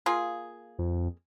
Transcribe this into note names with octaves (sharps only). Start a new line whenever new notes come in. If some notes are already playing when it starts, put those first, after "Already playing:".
A#3 F4 G#4
F2